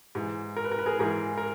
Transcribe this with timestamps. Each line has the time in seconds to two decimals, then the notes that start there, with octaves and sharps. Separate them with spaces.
0.15 G#2 E3
0.56 A#4
0.65 B4
0.72 A#4
0.79 B4
0.86 G#4 A#4
0.99 G#2 E3 G#4 A#4
1.37 A#4